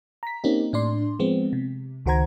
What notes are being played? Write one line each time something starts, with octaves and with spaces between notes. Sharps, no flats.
A#5 B6
A#3 C4 C#4 D#4 G4
A2 D4 D5 C6
F3 G#3 B3 C4
C3
C#2 D#3 F#4 C5 A#5 G#6